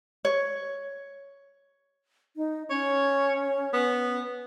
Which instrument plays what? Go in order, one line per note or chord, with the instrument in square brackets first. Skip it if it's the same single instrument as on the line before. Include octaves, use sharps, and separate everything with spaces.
[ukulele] C#5
[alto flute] D#4
[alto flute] C#4 [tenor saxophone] C#5
[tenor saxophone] B3